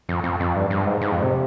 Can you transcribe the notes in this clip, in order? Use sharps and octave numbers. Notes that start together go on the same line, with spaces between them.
F2
F2
F2
G2
G2
G#2
G#2
F2
C3